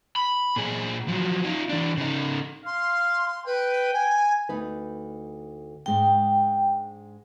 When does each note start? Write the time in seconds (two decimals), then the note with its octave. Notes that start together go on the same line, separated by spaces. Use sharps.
0.16 B5
0.56 A#2 G#4
1.08 F3 F#3
1.45 D#4 F4
1.69 E3 D4
1.97 C#3 D#4
2.66 F5 C6
3.46 B4 G5
3.93 G#5
4.49 D2 D#4 B4
5.86 G#2 G#3 D4 G5